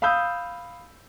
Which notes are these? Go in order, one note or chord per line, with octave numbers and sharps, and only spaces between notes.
F5 B5 D#6 E6 G6